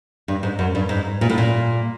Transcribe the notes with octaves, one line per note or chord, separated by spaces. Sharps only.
G2
G#2
F#2
G2
G#2
A#2
A2
A#2